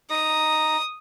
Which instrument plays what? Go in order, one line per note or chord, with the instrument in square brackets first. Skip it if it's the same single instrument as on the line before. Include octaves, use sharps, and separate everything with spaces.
[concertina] D#4 A#5 [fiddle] D#6